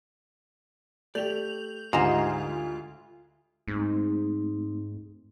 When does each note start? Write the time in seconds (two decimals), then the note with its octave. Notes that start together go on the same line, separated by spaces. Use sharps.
1.15 A3 G4 D5 G6 F7 F#7
1.93 D2 G#2 G#3 F4 G4 D#5 E5 A#5
3.68 G#2 A3 C4 D#4